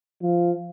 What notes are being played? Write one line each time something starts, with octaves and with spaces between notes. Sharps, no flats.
F3